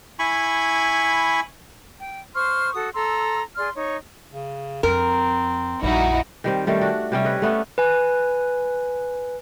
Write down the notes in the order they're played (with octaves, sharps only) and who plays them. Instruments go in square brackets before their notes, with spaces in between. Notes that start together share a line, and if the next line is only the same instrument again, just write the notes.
[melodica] E4 G#5 B5 C#6
[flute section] G5
C5 C6 C#6 F6
F#4 A4 D#6
A4 A#5 C6 E6
G#4 D5 C6 F6
D#4 C#5
[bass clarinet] C#3
[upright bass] F2 [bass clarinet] C4 [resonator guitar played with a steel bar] A#4
[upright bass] A#1 F2 [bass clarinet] G3 [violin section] D#4 E4 F#4
[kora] D#3 G3 C4
D#3 G3 A3 C#4
D4 F#4
C3 G3 C#4
B4 C#5 D#5
A3 B3 C#4 D4
[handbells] B4 G#5